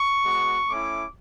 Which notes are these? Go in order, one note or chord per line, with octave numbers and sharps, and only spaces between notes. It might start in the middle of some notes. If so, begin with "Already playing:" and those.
Already playing: C#6
G#3 B3 F#4
A3 C#4 E4 D6